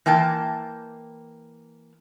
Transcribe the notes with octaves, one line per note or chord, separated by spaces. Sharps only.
E3 A#3 G5 A5